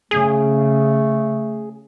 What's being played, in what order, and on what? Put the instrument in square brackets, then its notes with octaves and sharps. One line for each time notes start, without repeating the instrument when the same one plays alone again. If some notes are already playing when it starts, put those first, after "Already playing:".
[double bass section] C#3 [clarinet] A3 [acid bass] G#4